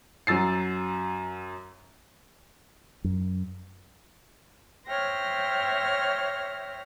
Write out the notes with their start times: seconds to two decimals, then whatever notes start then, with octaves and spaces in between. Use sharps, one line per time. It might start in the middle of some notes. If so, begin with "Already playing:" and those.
0.27 F#2 F#3 E6 A6 C7
3.04 F#2
4.89 C5 C#5 E5 G5 F6 A#6